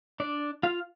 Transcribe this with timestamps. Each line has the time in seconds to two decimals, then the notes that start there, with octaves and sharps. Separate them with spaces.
0.20 D4 D5
0.63 F4 F5